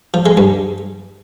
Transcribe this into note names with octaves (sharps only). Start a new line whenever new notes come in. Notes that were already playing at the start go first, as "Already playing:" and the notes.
F3
G#3
G2